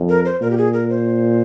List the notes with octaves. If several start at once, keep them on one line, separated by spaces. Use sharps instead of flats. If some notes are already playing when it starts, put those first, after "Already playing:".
Already playing: F2
A#4
C5
A#2 A#4
G4
G#4
A#4
C5